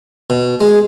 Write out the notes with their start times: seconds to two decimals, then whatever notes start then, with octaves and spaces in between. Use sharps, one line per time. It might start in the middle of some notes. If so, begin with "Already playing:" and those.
0.30 B2
0.61 G#3 G#4